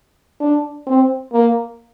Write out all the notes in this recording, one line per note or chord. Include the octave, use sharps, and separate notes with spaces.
D4
C4
A#3